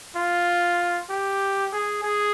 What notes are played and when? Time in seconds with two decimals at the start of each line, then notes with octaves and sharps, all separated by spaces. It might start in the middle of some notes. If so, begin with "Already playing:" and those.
0.16 F4
1.10 G4
1.73 G#4
2.03 G#4